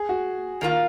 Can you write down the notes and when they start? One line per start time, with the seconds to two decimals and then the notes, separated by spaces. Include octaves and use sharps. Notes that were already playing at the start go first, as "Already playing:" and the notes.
Already playing: G#4
0.09 F#4
0.61 D#3 A#3 F4 A#4